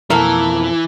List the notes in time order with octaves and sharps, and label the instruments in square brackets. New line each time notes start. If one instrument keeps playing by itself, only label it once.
[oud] F2 B2 A4 [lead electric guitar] E3 [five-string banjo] A#3